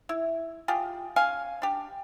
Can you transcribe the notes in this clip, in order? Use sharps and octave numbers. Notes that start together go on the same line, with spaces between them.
E4
F4 G4 G#4
C#4 F5 G#5
D4 G4